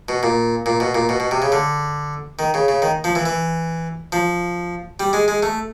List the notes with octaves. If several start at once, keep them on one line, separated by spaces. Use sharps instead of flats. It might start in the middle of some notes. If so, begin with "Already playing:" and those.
B2
A#2
A#2
B2
A#2
B2
B2
C3
C#3
D3
D#3
C#3
C#3
D#3
F3
E3
E3
F3
G3
G#3
G#3
A3